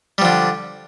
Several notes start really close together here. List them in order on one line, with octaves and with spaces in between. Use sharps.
G3 F3 D3